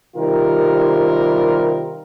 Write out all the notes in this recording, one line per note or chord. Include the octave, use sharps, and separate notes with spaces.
C3 D#3 G3 F4 A#4